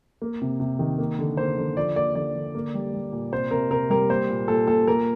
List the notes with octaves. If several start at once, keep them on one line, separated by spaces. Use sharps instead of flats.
A#3
C3
C3
D#3
A#3
D3
A#3 C5
D3
F3 D5
A#3 D5
D3 D5
D3
A#3
G3
G3
A#2
C3 C5
C3 A#4
C3 A#4
G3 A#4
A#3 C5
A#2
A#2 A4
A#2 A4
A#3 A#4